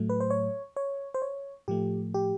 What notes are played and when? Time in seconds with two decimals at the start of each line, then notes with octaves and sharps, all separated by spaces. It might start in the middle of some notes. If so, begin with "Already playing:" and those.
Already playing: A2 F#3 A3
0.10 B4
0.20 C5
0.30 C#5
0.76 C#5
1.14 C5
1.22 C#5
1.68 A2 F3 A3 G4
2.14 G4